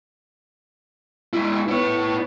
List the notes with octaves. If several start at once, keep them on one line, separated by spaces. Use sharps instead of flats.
G#3 E4
B3 E4 C#5